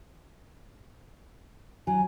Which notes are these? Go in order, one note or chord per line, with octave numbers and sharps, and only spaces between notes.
F#3 G#5